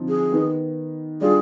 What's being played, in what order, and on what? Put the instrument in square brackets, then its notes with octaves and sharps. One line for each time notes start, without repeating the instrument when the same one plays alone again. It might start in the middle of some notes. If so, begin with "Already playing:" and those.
Already playing: [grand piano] D3 F3 C4 D#4
[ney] G#4
[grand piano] D#3 B3 D#4
[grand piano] G3 D4 F4 [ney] G#4